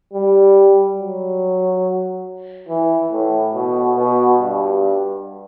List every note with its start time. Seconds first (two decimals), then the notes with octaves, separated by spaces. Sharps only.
0.13 G3
0.98 F#3
2.68 E3
3.12 A2
3.54 B2
3.96 B2
4.39 G2